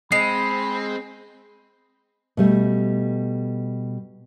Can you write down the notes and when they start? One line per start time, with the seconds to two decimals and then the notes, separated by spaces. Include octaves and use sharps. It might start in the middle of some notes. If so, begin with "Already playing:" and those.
0.12 G#3 C4 B5 C7
2.37 B2 G3 A3